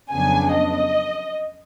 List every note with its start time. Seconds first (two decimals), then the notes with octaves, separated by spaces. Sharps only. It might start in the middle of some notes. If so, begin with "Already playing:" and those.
0.10 F2 C#3 F#3 B3 D4 G#5
0.55 D#5